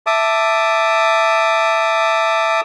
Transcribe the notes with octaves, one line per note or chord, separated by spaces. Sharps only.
E5 A5 D6 D#6